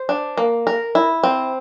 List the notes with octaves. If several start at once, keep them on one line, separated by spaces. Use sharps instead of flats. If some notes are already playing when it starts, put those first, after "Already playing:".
Already playing: C5
D4
A#3
A#4
E4
C4